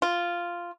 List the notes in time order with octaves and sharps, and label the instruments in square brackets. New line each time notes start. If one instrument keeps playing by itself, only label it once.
[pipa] F4